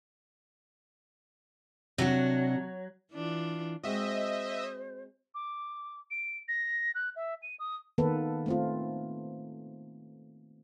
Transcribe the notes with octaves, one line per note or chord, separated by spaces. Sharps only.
C3 F#3 D4 F#4
E3 D4 F4
G#3 C4 F#4 C5 D#5 E5
D6
D7
A#6
F#6
E5
D#7
D#6
D#3 A#3 B3 A4 B4
A3 C4 F4